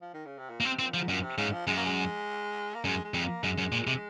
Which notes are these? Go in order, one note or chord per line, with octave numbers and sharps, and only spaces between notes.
F3
D#3
C#3
C3
A#2
A#3
C3 C4
A#2 C4
G#2 F3
F#2 A#2
C3
G#2 C#3
F3
F#2 G#3
A#3
G#3
A#3
F#2 G#3
G#3
F2
A#3
F#2 G#3
F#2
A#2
C3